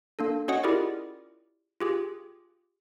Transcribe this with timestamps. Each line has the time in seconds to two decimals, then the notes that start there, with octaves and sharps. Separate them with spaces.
0.19 A#3 D4 A4
0.48 C#4 F#4 C#5 D#5 F#5 D#6
0.64 E4 F4 G4 G#4 A#4 D5
1.80 F4 G4 G#4